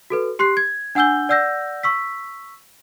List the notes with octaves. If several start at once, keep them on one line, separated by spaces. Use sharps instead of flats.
F#4 A4 B4
G4 C6 F#6 C7
G#6
D4 F#5 G#5 E6 G6 G7
D5 F#5 E6 G6 A#6
C#6 E6 B6